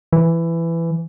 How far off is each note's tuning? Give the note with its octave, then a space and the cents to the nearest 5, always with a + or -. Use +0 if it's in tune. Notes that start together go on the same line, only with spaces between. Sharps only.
E3 +15